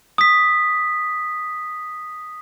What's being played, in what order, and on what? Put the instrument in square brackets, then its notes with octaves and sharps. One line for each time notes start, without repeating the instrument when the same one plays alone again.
[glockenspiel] D#6 B6